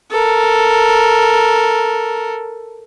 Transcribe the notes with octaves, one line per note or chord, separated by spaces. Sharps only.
A4 A#4